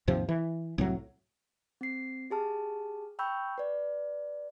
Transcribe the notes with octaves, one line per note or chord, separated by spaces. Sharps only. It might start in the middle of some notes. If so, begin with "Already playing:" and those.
D#2 G#2 C3 F3
E3
C2 A2 F#3
C4 C7
G4 G#4 A5 F6
G5 B5 C#6 E6 G6
B4 D5